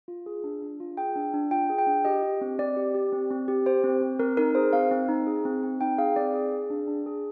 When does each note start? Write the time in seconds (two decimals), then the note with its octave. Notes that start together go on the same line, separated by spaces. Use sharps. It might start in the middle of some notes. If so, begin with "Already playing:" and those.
0.08 F4
0.26 G#4
0.44 D4
0.62 D4
0.80 F4
0.97 G#4 G5
1.16 D4
1.34 D4
1.51 F4 G5
1.70 G#4
1.78 G5
1.87 D4
2.05 G4 D#5
2.23 G4
2.41 C4
2.59 C4 D5
2.76 G4
2.95 G4
3.12 C4
3.30 C4
3.48 G4
3.66 G4 C5
3.84 C4
4.01 C4
4.19 C4 A#4
4.37 D#4 A#4
4.55 G#4 C5
4.73 C4 F5
4.91 C4
5.08 D#4
5.27 G#4
5.45 C4
5.63 C4
5.81 D#4 G5
5.98 G#4 F5
6.16 C4 D5
6.34 G#4
6.52 G#4
6.70 D4
6.88 D4
7.06 G#4